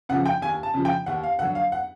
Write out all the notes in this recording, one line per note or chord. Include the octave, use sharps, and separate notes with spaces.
C#3 F3 F#5
G5
D#2 G#5
A5
C#3 F3
G5
D#2 F#5
F5
D3 F#3 F#5
F5
F#5